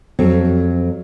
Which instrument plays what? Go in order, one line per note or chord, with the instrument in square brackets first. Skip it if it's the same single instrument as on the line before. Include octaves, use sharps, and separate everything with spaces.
[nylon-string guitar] F2 F#3 C4 A4